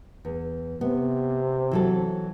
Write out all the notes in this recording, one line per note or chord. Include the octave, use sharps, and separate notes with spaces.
E2
C3 B3
E3 F#3 A4